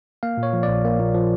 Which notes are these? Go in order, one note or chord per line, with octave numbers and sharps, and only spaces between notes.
A#3 F5
A#2
C#5
F3
D5
A#1
A#3
A#2
F3